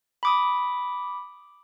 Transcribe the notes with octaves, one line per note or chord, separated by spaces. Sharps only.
B5 D6 D#6